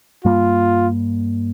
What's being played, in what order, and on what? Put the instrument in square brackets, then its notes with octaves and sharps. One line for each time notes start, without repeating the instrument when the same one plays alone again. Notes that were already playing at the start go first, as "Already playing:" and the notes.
[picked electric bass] G2 G3 A#3 [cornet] F4